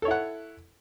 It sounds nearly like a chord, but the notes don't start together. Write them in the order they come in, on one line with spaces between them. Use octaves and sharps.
A4 C#5 E4 F#5